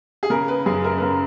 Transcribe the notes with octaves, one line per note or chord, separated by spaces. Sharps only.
G#4
C#3 A#4
B4
F#2 G#4
A#4
B4
C#3 A#4